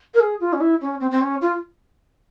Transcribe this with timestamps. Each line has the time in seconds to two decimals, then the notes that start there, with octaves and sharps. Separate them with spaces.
0.14 A#4
0.20 G#4
0.40 F4
0.53 C#4
0.61 E4
0.81 C#4
1.01 C4
1.11 C4
1.21 C#4
1.41 F4